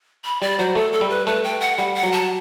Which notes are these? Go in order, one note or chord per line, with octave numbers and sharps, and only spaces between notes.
B5
G3 D5
F#3 C5
A3 A4
A4
G3
B4
A3 B4
G5
F#5
G3 F#5
F#5
F#3
A5